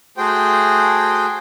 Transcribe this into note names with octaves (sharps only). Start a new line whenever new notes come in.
A3 F#4 G#4 C5 G5